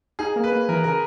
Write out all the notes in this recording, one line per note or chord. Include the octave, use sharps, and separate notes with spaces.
D#4 G#4
A#3
B4
A#3
E3 A#4
C#3 A#4